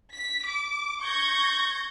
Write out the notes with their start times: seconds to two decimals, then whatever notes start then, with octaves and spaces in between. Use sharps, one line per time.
0.14 B6
0.47 D6
1.03 C#6 G6 G#6 A#6